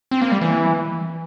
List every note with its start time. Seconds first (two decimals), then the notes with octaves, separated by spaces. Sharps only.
0.11 C4
0.21 A#3
0.31 G3
0.42 E3